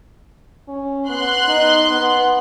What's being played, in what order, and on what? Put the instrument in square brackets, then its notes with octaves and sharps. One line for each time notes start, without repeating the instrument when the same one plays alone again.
[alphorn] C#4
[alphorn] B3 [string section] C6 F#6
[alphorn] D#4
B3